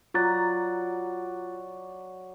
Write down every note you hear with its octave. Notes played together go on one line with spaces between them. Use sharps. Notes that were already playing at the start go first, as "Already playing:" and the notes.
F#3 F4 D5 A#5 F#6 A6